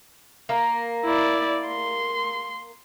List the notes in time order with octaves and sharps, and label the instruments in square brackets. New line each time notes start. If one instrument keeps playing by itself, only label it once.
[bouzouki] A#3
[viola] E4 D5
C6